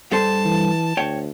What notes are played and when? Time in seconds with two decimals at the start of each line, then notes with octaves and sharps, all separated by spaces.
0.12 G2 A4 C5 A5
0.45 E3
0.97 D2 C#5 G5